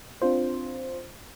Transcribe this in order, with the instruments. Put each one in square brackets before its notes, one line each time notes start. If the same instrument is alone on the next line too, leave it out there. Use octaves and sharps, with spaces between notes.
[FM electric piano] C4 D4 F4 C5